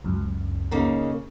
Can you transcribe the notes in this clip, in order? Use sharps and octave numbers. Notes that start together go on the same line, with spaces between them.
C#2 F#2
C#3 A#3 D#4